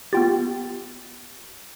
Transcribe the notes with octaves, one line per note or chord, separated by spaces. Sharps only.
B3 F4 G4 G5 A6